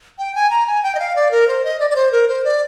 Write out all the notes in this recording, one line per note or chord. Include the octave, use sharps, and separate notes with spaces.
G5
G#5
A#5
G#5
G5
D#5
F5
D5
A#4
C5
D#5
D5
D5
C5
A#4
C5
D5